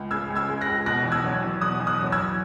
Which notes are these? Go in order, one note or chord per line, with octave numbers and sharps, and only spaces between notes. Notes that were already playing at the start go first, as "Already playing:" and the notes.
Already playing: C#2
C#3 E6 G#6
C#2
E6 G#6
G#3
F#6 A#6
C#2
B2 F#6 A#6
E2
E6 G#6
F#3
E2
B2 D#6 F#6
E2
D#6 F#6
F#3
E6 G#6
E2